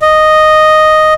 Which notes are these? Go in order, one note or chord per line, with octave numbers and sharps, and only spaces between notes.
D#5